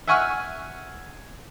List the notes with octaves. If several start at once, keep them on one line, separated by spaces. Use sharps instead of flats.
E5 F#5 G#5 C#6 E6 F6